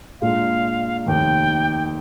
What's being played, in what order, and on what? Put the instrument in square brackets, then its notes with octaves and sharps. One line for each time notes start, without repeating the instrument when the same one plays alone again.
[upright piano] A#2 G#3 D4 F4 [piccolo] F5
[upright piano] F1 D#2 D#3 [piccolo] G5